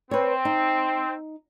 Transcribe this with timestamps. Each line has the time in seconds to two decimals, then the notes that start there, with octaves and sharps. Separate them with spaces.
0.11 C4 B4 C#5
0.45 D#4